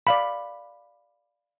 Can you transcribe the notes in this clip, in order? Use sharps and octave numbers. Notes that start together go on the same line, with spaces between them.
D5 F5 B5